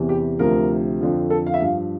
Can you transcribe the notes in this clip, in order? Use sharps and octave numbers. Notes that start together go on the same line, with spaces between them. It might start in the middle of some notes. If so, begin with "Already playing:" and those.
Already playing: E2 C3 E3
G4
D2 C3 F3 A#4
F2 D3 F3
A4
F5
E5
G2 F3 F5